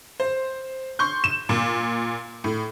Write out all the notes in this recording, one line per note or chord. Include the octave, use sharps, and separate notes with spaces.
C5
C6 C#6 G6
E7
A#2
A2